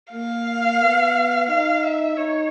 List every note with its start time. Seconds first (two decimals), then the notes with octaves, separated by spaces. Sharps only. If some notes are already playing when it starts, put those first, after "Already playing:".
0.12 A#3 F5
0.81 B3
1.48 D#4 F5
1.83 E5
2.17 D#4 C#5